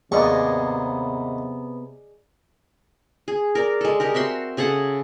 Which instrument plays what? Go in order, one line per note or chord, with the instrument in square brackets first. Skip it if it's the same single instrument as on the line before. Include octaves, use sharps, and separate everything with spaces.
[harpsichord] D#2 G#2 C#6 [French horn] C3 [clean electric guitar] B3 [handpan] G#4 D5 D#5
[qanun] G#4
A#4 D5
G#3 A4
G#3 G4 A#4
C4 F#4 E5 C6
C#3 G#4 A4 F#5